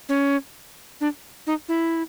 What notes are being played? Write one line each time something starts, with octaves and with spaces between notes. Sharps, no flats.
C#4
D4
D#4
E4